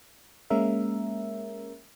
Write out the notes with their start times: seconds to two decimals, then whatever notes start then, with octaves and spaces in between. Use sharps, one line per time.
0.50 G#3 A#3 C#4 A#4 E5